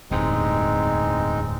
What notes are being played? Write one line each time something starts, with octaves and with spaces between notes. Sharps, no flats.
D1 E2 G2 G#3 C4 D#4